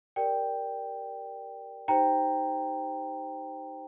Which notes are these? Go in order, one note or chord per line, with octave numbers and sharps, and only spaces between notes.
G4 A#4 D5 G5
D#4 G4 C5 G5 A#5